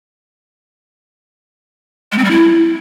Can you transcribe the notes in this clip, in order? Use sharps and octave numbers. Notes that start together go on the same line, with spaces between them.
G#3
C4
G3
E4